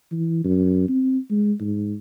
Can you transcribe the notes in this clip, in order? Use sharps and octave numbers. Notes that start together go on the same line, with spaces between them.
E3
F#2
C4
G#3
G#2